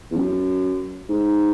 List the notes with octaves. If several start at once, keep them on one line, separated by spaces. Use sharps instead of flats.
E2
F#2
G#2